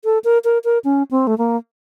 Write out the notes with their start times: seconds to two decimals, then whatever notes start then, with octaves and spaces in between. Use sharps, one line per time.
0.05 A4
0.24 A#4
0.44 A#4
0.64 A#4
0.84 C#4
1.11 C4
1.27 A3
1.38 A#3